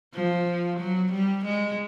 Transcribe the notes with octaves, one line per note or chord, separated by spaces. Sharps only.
F3
F#3
G3
G#3